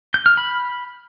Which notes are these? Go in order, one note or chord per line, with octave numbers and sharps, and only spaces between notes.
G6
F6
B5